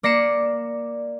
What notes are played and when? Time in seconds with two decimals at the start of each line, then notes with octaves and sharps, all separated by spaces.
0.03 A#3 D5 A#6 C7 C#7 E7